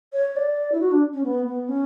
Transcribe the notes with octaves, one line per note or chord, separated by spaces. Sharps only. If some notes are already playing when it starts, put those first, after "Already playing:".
C#5
D5
E4
F#4
D4
C#4
B3
B3
C#4